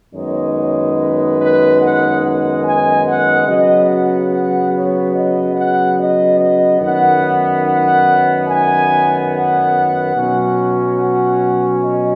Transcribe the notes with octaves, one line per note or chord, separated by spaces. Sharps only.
F#2 D#3 G#3 B3 D#4 C#5
B4
B4
F#5
F#5
G#5
F#5
C#3 F#3 B3 D#5
F#5
F#5
C#5
D#5
F#5
D#5
D#5
F#2 D#3 B3 F#5
F#5
G#5
F#5
B2 F#3 C#4
F#5
D#5